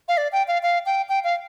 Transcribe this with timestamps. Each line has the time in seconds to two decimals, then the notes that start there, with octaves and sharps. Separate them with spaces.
0.08 F5
0.18 D5
0.32 G5
0.48 F5
0.63 F5
0.86 G5
1.09 G5
1.24 F5